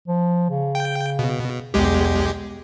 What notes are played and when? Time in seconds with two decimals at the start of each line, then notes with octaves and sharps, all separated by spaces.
0.08 F3
0.50 C#3
0.75 G5
1.19 B2
1.74 B1 E2 G#3 G4